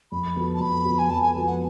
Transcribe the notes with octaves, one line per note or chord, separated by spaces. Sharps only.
F2 B5
F3 B3 F#4 A4
A5
F2 B5
F3 B3 F#4 A4
G#5
F2 A5
G#5
F3 B3 F#4 A4
F#5